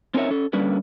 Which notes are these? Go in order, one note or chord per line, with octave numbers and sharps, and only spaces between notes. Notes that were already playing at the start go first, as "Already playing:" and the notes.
C4 C#4 D#4 A#4 C#5 E5
C#4 A4
D3 G3 A#3 C#4 B4